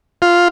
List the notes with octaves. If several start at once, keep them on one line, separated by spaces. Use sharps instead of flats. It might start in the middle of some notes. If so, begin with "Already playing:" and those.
F4